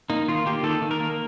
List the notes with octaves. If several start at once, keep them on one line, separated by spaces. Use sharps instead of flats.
A#3 D#4
D#3 F4
A#3 G4
D#3 A4
D#3
A#4
A#3